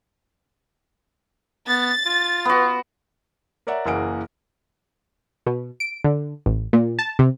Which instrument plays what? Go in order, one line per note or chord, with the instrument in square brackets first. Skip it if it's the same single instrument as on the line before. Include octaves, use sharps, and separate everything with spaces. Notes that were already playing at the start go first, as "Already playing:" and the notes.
[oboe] B3 [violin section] A6
[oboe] F4
[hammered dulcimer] B3 F#4
[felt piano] A#4 C#5 D5 E5 F#5 A#5
F#1 E3 A#3 G#4 F#5 D7
[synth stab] B2
D7
D3
A1
A#2
A5
C3